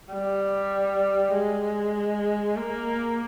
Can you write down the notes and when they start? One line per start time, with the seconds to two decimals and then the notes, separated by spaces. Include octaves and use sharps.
0.11 G3
1.34 G#3
2.57 A#3